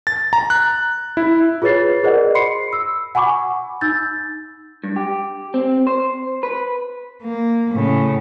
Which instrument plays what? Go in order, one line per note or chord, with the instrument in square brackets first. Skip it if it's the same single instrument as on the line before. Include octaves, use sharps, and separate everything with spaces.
[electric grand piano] A6
A#5
F#6
E4
[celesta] F4 G#4 B4 C#5 A6 C7
G#4 A#4 C5 D5 D#5 F#5
B5 C6 C7 C#7
E6
F#5 G#5 B5 C#6 D6
D#4 E6 G6 A6
[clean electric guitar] G2
G4
C4
C5
B4
[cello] A#3
A2 C#3